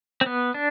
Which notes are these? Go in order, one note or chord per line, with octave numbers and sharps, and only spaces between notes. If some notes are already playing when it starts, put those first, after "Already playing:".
C4
B3
D4